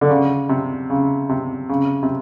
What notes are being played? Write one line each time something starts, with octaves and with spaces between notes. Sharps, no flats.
D3
C#3
C3
C#3
C3
C#3
C3